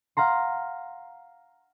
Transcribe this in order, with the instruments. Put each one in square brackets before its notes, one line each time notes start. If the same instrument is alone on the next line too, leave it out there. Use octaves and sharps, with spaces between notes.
[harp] F5 F#5 A#5 C6